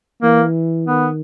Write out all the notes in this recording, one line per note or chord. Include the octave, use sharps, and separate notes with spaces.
E3 A#3
D#3 B3